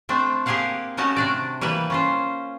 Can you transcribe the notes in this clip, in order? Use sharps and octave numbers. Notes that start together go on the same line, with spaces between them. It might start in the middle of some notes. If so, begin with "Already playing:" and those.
A3 C4 D4
A#3 G4 G#4 A#4 F5 F#5
G3 A3 C#4 F#4 D#5 A5
C3 D4 D5
E3 G3 A#3 B4
C#4 F4 C5